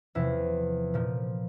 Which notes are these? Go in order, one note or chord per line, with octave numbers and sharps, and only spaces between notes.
E2 C3 F3 E4
A#2 F3